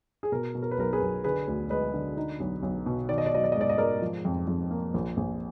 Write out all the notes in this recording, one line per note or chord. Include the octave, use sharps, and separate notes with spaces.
G#4
B2 A#4
B2
A#4
B4
B1 A#4
G#4 B4
B1
D3 G#4 B4
D2
G#3 B4 D#5
D3
D#4
B1
B1
B2
D#3 D5
D#5
D5
F#3 D#5
D5
G#2 D#5
D5
D#5
G#2 A#4 D5
F3
F2
F2
A#3
A#1
A#1